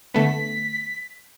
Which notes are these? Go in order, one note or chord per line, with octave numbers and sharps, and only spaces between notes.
D3 A3 B3 B6